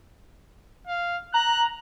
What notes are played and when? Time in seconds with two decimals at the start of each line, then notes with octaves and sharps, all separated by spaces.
0.87 F5
1.34 A#5 F#6